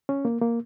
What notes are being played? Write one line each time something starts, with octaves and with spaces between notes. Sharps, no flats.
C#4
A#3
A#3